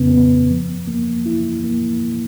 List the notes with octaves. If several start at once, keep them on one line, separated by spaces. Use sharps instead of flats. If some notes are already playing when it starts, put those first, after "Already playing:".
Already playing: F2 C#3 B3
B3
F3
A#3
E4
A#3